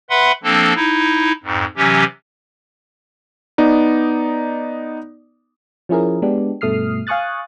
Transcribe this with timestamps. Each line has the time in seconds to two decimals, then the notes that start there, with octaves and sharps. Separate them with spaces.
0.10 B4 E5 F#5 B5 C6
0.43 F3 A#3 C4 D4 A4
0.76 D#4 E4
1.44 F2 G#2
1.77 C3 E3 F#3 C#4 G4
3.58 B3 D#4 D5
5.89 F3 C#4 E4 G#4 A#4
6.22 G#3 B3 D4 G4
6.61 G2 B2 A3 D#6 F6 C7
7.07 F5 G#5 C#6 D#6 F#6 A6